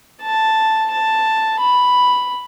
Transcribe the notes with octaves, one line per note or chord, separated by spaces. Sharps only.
A5
A5
B5